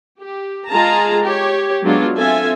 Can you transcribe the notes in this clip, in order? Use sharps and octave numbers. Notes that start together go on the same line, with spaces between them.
G4
G#3 F4 G#4 A5 A#5
G4 C#5
F#3 G#3 B3 D4 F4
C4 F4 A4 E5 G#5